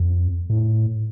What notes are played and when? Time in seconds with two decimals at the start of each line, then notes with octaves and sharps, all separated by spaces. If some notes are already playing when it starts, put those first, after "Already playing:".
Already playing: F2
0.49 A2